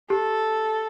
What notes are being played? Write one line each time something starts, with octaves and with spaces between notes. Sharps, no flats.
G4 A4